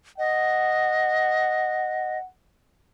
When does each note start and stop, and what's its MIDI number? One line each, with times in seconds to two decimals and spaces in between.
0.18 2.18 75
0.18 2.28 78